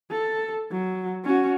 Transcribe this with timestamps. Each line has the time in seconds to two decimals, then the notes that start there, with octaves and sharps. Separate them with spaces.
0.11 A4
0.72 F#3
1.25 C#4 F#4